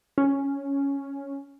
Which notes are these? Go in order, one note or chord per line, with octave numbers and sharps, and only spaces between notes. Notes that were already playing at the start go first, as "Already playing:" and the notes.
C#4